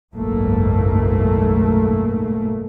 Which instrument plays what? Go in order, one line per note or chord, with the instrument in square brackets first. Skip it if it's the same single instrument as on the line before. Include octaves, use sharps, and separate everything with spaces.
[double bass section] F#1 B1 G#2 A3 A#3